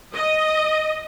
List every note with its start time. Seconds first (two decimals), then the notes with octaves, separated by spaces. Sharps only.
0.14 D#5